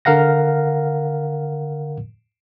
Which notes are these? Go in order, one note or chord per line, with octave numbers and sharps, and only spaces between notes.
D3 A#4 F5 F#5 A#6